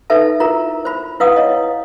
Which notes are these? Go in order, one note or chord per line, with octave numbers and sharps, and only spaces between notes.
D#4 A4 B4 E5 A5
E4 F4 A#4 A#5
C5 B5
E4 B4 F5 F#5 D#6
E4 C#5 D#5